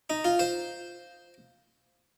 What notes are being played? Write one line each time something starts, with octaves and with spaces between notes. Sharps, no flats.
D#4
F4
C5